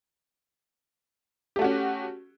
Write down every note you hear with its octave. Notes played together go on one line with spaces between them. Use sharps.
A3 C#4 F#4 G4